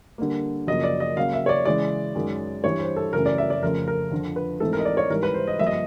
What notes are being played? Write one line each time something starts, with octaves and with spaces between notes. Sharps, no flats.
D3 G3 A#3
F#2 C#3 F3 A#3 D#5
D5
D#5
C#3 F#3 A#3 F5
E5
C#5
D5
C#3 E3 G#3 D5
F#2 D#3 G#3 C#4
G2 E3 G3 C#5
C5
A4
F#2 C#3 E3 A3 C#4 A#4
D5
E5
D5
F2 C#3 F3 A3 A#4
A#4
F2 D3 F3
B4
G#2 E3 A3 C4 D#4 A4
A#4
D#5
D5
C#5
G#2 E3 G3 A#4
B4
C5
D#5
G2 D3 F3 A#3 E5
D#5